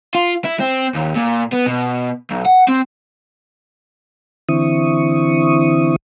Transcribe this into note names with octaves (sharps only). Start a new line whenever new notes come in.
F4
E4
C4
D#2
A#2
B3
B2
B1
F#5
C4
D3 E3 C4 E4 C#6 D#6